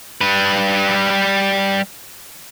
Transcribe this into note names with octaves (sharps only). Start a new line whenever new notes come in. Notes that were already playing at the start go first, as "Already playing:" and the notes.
G3 B4